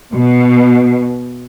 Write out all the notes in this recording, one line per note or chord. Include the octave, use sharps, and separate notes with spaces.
B2